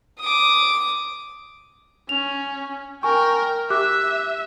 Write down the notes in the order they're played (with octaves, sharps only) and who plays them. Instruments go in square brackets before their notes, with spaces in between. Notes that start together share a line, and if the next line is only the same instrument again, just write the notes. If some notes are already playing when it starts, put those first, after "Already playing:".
[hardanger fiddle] D6 D#6
[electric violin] C#4 [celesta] F7
[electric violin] A#4 G5 [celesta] G#5 C#6
[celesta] G4 D6 F#6 [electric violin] E5